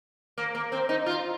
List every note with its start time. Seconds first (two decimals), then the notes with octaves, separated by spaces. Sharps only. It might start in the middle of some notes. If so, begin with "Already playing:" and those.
0.38 A#3
0.55 A#3
0.72 C4
0.89 D#4
1.06 F4